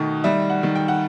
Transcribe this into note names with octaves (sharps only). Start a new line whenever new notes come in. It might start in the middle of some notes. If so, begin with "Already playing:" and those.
Already playing: B2 D#3 A3
G3 E5
F#5
D#3
G5
F#5